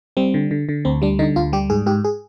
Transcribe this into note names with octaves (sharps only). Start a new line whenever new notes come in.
G3 C4
D3
D3
D3
D2 C4
G3 D4
D3 D#4
D2 F4
G3 G4
G#2 G#4
G#2 G4
G#4